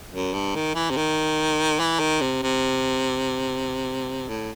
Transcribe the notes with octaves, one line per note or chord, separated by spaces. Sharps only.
F#2
G2
D#3
E3
C3
D#3
E3
D#3
C3
C3
A2